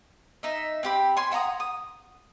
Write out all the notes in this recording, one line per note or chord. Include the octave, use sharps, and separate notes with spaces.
D#4 E5
C4 G4 B5
C#5 G#5 C6
E5 F#5 A#5 D#6
D#6